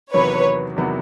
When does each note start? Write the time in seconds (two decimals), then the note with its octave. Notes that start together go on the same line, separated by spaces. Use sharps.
0.14 E2 C3 D#3 F#3 B3 B4 C#5
0.76 E2 C3 D#3 F#3 B3